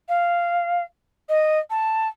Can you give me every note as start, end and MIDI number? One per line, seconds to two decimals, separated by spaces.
0.08 0.83 77
1.29 1.59 75
1.70 2.08 81